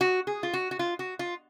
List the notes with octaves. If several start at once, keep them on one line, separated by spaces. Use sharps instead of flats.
F#4
G#4
F4
F#4
F#4
F4
F#4
F4